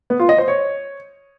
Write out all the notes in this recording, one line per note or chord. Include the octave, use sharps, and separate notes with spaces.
B3
F4
D#5
C5
C#5